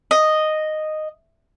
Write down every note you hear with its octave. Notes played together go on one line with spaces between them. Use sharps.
D#5